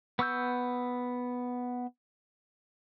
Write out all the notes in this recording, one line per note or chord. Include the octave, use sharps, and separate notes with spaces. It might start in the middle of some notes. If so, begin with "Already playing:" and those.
B3 C#6 E6 G6